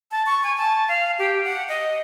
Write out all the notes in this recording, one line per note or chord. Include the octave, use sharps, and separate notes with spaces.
A5
C#6
G#5
A5
F5
G4
F#5
D#5